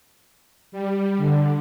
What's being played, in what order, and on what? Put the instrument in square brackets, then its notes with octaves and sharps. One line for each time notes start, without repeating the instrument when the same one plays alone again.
[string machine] G3
D3